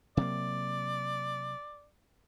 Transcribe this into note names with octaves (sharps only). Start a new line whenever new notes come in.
C3 F#3 A#3 D5